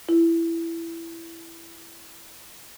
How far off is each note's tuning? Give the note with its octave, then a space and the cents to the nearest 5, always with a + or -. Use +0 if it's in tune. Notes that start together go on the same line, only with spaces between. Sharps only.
E4 +15